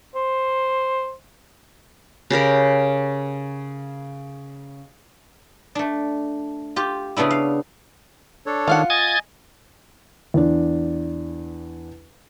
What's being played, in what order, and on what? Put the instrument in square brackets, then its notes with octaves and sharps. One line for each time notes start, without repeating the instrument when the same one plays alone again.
[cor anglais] C5
[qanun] C#3 G4 A#4 B5
[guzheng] A3 D4
F4 G4
C#3 B3 D4 E4
F5
[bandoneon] D4 A4 C#5
[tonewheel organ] D#3 [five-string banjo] F4 F5 F#5
[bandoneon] D#5 G#5 [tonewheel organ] D#6 G#6 A6
[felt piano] E2 D4